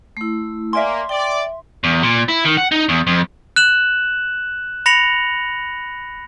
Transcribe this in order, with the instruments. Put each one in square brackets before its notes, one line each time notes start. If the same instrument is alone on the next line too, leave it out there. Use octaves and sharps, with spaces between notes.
[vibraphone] A3 E4
[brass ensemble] A#3 [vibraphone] D5 G#5 [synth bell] E5 C6
[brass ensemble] D5 [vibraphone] G5
[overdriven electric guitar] E2
A#2
E4
D#3
F#5
D#4
E2
F2
[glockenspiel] F#6 E7 F#7
B5 A#6 C#7 F7 F#7